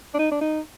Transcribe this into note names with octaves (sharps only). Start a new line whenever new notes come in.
D4
D#4
D4
D#4